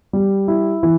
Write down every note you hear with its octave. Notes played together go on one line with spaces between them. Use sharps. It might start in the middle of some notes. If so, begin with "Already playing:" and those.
G3
E4
E3